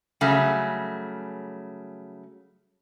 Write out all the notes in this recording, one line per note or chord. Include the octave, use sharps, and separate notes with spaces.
C#3 F#3 G3 A3